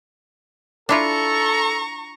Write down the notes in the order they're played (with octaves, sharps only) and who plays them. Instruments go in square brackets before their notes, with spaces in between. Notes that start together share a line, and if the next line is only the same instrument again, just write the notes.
[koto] D4 E4 F4 [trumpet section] A4 [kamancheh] A#5 C#6